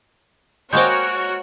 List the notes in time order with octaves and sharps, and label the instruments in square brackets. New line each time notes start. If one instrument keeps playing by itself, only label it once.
[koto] G#3 A#3 G5 [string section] F#4 A#4 C#5 [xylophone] C5 G6